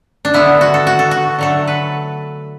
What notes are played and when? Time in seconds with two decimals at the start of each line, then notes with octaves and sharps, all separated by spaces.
0.25 D4
0.34 D3 B3 E4
0.61 F#4
0.74 A4
0.87 F#4
0.99 A4
1.11 F#4
1.39 D3 F#3 A3 A4
1.67 B4